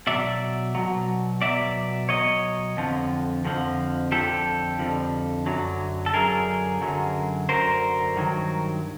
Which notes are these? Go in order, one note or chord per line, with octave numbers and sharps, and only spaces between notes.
B2 F#3 D5 E5
B2 F#3
B2 F#3 D5 E5
B2 F#3 C#5 D#5
F2 D3 F3
F2 D3 F3
F2 D3 F3 G4 A4
F2 D3 F3
F#2 D3 F#3
A4
F#2 D3 F#3 G#4 A#4
F#2 D3 F#3
F#2 D3 F#3 A#4 C5
G2 D#3 F#3